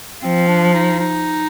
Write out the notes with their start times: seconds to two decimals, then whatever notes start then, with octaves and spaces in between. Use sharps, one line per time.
0.22 F3 C4
0.48 D4
0.74 D#4
0.99 D#4